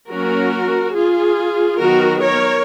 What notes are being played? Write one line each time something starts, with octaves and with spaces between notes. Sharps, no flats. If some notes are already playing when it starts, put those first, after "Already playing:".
F#3 A#3 C#4 F#4 A#4
F4 G#4
D#3 F#3 B3 F#4 A#4
A#4 C#5